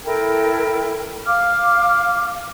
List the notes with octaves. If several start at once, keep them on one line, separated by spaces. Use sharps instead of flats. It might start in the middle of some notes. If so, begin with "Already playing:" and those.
E4 A4 A#4 G5
F5 D6 F6